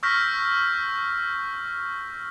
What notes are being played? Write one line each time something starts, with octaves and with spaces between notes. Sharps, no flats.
C#6 E6 F6 G6 A#6 B6